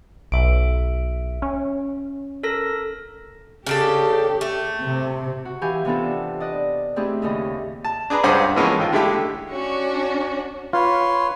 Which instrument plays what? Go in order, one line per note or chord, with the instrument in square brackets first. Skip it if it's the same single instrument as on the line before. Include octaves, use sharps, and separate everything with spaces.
[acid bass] B1 [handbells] E5 D7
[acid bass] C#4
[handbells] A4 A#4 A#6
[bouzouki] C#3 D4 A4 [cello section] G4
[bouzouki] A3
[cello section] C3
[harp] F#4
E3 G4 F5 G#5 G6
C3 E3 B3 D4 F4 A4
D5 D#5 F#6
A3 C4 D4 E4 G4 G#4
D#2 A2 C#3 D#5
[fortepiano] A5
D4 G#4 B4 A#5
C#2 G2 G#4 C5 F#5 D6
E3 F3 G#3 A#3 B3 C#4
A2 D#3 F4
D3 G#3 A3 E4 G4
[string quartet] C#4 D4 F#4 C#5
[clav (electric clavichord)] F4 [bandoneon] B4 C#5 C6